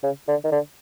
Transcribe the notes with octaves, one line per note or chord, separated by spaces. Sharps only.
C#3
D3
D#3
D3